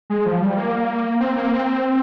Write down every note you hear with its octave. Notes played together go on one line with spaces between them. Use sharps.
G#3
F3
G3
A#3
C4
A#3
C4